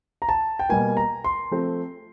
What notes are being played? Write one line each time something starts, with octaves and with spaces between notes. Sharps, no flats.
A#5
A5
G5
B2 G3 A#3 G#5
A#5
C6
F3 A3 C4